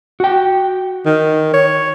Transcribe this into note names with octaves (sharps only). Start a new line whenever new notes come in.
F#4 G5
D#3
C#5